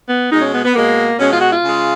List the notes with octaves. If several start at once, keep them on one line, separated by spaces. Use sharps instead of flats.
B3
B2 G#3 D#4
C#4
B3
B3
B2 G#3 A#3
B2 G#3 C#4
F4
F#4
F4
C#3 G#3